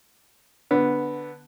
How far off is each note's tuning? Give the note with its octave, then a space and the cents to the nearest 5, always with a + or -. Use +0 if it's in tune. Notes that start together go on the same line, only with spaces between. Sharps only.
D3 +0 B3 +0